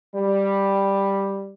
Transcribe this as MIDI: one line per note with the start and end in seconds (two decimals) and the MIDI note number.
0.15 1.52 55